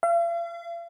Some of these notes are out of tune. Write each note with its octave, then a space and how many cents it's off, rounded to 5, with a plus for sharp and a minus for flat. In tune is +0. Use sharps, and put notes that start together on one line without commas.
F5 -45